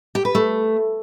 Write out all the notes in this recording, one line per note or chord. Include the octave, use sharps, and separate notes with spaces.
G4
B4
A3